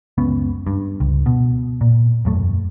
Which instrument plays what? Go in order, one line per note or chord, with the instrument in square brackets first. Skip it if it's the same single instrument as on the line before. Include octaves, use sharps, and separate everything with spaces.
[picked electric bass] F#1 C#2 B3 C#4
G2
C#2
B2
A#2
E1 F#2 A3